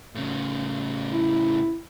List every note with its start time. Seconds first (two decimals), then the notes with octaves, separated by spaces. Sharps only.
0.15 A2 C#3
1.11 E4